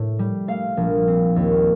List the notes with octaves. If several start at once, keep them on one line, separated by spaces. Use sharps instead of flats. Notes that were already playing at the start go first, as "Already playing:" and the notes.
Already playing: A2
G3
A3 F5
A#1
C4
D#2